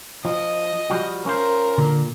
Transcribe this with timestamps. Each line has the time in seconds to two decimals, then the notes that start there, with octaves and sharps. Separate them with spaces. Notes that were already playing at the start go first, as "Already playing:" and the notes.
0.25 F3 D#5
0.90 F3 G3 F#4
1.26 C#4 F4 A#4 C5
1.78 A#2 D3 A#3